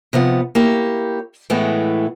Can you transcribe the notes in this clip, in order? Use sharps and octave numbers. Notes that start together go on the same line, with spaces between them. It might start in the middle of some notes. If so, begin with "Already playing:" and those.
C3 F3 B3 F#5
A#3 E4 G4 C#5
A2 E3 G#3 A3 B3